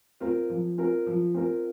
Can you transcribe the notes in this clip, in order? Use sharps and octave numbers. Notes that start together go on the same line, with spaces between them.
C4 F4 A#4
F3
C4 F4 A#4
F3
C4 F4 A#4